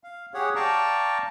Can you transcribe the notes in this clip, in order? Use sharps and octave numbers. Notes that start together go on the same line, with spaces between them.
F5
G4 G#4 C#5 F#5
D5 F5 G5 A5 A#5 C#6